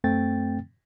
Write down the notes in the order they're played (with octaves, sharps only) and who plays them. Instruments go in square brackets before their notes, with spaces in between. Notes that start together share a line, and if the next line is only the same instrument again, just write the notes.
[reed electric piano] F#2 A3 C4 G5 A6